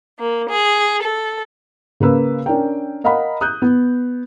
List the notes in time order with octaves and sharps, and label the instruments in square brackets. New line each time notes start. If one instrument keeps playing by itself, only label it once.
[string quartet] A#3
G#4
A4
[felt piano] C#3 A#3 B4 E6
C#4 D4 A#4 G5
A#4 D#5 F5 F#5 A#5 B5
D#6 F#6 G6
B3